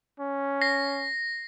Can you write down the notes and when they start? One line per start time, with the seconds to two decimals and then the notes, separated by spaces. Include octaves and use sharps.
0.20 C#4
0.62 A#6 C7